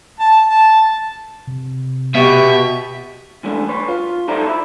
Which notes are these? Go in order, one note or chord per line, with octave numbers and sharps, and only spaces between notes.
A5
A5
C3
B2 G4 E5 C#6
G#2 E3 A3 D4
B1 B4 C#5
F4
D#4 A4 C5 D5 E5 A#5
E4